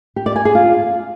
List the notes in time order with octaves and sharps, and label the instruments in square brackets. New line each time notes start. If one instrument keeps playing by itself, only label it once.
[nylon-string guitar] G4
D5
G#5
G#4
F4